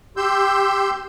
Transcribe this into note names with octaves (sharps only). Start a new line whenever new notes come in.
G4 C6 E6 G6